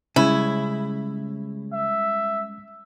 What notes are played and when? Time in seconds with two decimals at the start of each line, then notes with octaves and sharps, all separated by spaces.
0.16 C#3 G3 G#3 C#4 E4
1.73 E5